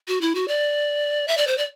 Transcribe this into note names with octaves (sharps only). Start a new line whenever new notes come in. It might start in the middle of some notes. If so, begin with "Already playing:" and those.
F#4
E4
F#4
D5
E5
D5
C5
D5